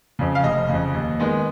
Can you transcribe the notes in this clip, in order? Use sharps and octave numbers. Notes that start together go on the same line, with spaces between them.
F2 C#3
F5
F1 D#5
F2 C#3
D#2
D#3 G#3 B3